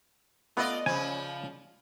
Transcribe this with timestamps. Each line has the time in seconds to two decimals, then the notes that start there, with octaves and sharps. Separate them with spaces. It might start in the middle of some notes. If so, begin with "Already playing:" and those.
0.57 A3 B3 F4 D5 D#5
0.86 C#3 F3 G#5